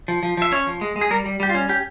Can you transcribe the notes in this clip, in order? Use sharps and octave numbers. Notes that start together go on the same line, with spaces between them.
F3
F3
F3 E5
C#4 C#5
F3
G#3
G#3
G#4
G3 A#4
G3
G3 G4
F4
C#4
C#4 G4